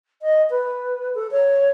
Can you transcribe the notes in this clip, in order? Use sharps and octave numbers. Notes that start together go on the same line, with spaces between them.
D#5
B4
A4
C#5